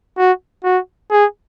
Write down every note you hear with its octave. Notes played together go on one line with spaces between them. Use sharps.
F#4
F#4
G#4